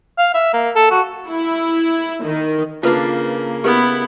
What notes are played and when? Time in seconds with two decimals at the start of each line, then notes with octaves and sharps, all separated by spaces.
0.18 F5
0.34 E5
0.53 A#3
0.76 A4
0.91 F#4
1.27 E4
2.25 D#3
2.83 C#3 A#3 D4 F4 A4 B4
3.64 B3 E4 G4 A#4 B4